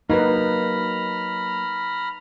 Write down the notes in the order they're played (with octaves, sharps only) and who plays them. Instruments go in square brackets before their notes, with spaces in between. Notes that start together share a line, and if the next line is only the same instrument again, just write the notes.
[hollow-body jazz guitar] F#3 A#3 [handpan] D#4 B4 [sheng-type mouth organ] A#5 B5 F6